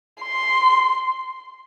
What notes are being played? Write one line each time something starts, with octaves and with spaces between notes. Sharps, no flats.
C6